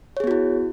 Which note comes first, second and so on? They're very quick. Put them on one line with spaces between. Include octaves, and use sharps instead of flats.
C#5 G#4 B3 F#4 E4